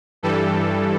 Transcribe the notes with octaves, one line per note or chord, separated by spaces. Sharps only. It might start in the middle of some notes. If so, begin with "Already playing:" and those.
G2 E3 G3 A4